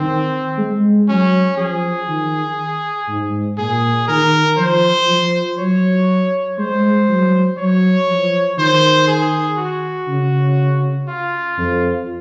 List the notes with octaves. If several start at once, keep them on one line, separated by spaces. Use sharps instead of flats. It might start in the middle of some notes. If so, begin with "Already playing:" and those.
Already playing: D#3 C4
G#3
F#3 C#4
F3 G#4
D#3
G#2
A#2 G#4
D#3 A#4
F3 C5
F3
F#3 C#5
G#3 C5
F#3
F#3 C#5
F3
D#3 C5
G#4
F#4
C#3
F4
F2